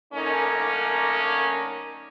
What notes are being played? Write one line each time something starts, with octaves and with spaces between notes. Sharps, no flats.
F#2 D3 A3 A#3 C#4 D#4